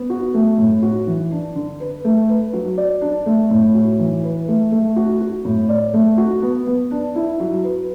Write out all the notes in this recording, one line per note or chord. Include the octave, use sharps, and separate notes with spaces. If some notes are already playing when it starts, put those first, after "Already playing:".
Already playing: B3
F#4
A3
A2
F#4
E3
D4
D3
B4
A3
B4
F#3
D5
D4
A3
A2
F#4
E3
B4
A3
A3
F#4
F#4
A2
D5
A3
F#4
B3
B3
D4
E4
F#3
B4